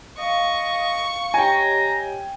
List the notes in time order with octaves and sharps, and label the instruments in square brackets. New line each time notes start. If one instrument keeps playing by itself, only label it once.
[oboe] D#5 [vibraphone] F5 [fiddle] C#6
[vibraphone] G4 C#5 D#5 [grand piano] G5 G#5 [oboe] A#5